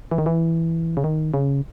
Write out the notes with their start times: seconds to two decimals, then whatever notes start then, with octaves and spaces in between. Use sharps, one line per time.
0.11 E3
0.18 D#3
0.26 E3
0.97 C#3
1.04 D#3
1.34 C#3